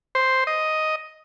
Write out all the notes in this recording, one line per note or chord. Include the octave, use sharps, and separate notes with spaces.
C5
D#5